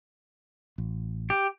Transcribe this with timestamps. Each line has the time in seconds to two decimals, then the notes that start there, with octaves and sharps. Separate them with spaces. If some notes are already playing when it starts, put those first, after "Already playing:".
0.78 A1
1.30 G4